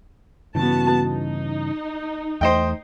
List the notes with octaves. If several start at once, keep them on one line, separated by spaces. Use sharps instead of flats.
G2 C#3 E3 B3 F#4 A5
D#4
E2 A3 C5 D#5 G5